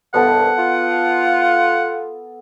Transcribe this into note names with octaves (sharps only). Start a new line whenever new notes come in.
C2 G2 B3 A4 F#5
F4